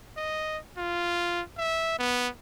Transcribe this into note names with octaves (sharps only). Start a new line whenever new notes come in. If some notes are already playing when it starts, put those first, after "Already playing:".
D#5
F4
E5
B3